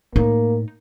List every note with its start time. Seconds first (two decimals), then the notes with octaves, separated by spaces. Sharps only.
0.16 A2 A#3 D#4